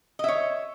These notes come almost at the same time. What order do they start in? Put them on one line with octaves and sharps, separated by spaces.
D#5 E5 C#5